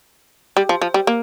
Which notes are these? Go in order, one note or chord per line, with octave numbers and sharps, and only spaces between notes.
G3
F3
F3
G3
A#3